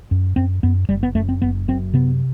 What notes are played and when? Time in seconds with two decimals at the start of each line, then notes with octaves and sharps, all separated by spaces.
0.11 F#2
0.36 F#2 C4
0.63 F#2 B3
0.89 F#1 G3
1.03 B3
1.15 F#2 A3
1.29 C4
1.42 F#1 B3
1.68 F#2 C4
1.94 C3 B3